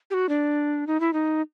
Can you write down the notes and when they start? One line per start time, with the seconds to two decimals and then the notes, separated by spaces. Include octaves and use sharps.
0.11 G4
0.14 F#4
0.29 D4
0.87 D#4
1.00 E4
1.13 D#4